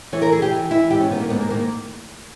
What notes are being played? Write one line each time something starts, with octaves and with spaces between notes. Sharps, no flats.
E3 C#5
A#4
E3 G#4
G4
E3
E3 E4
G#2 G4
C#4
D#3 B3
A#3
G#2 B3
A#3
D#3 A#3